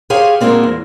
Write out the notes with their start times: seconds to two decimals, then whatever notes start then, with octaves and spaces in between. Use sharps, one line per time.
0.10 G4 G#4 C5 C#5 F5 G#5
0.41 D2 A#2 G#3 A#3 C4 D4
0.63 E2